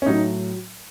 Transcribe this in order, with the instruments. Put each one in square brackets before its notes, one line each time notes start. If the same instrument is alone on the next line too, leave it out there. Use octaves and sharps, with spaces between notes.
[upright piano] C#4
A2 F#3 D#4